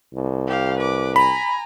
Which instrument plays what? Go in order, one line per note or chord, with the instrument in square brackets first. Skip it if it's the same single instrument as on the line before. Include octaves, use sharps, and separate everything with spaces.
[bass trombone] C2
[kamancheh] G4 F5
B4 D6
[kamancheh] G#5 A#5 [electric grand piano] B5